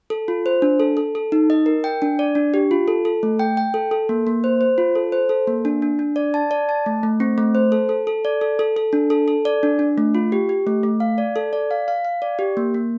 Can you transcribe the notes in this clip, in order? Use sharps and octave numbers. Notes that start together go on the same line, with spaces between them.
A4
F4
C5
D4
A4
A4
A4
D#4
D#5
A#4
G5
D4
D5
D4
G4
F4
A4
A4
A3
G5
G5
A4
A4
A#3
A#3
C5
C5
F4
A4
C5
A4
A#3
D4
D4
D4
D5
A5
D5
A5
A3
A3
C4
A3
C5
A4
A4
A4
D5
A4
A4
A4
D4
A4
A4
D5
D4
D4
A3
F4
G4
G4
A3
A3
F5
D5
A4
D5
F5
F5
F5
D5
G4
A#3
A#3